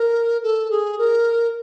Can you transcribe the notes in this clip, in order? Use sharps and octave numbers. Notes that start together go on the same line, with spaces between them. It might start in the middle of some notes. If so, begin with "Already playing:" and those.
Already playing: A#4
A4
G#4
A#4